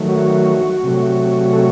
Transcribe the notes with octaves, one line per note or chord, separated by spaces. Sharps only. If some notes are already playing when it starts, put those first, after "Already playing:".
Already playing: D#3 F#3 A3
F#4
C3 F#3 A3
A4